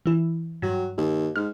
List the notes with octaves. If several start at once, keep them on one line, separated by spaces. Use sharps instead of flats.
E3 E4
G2 F#3
D#2
G#2 F6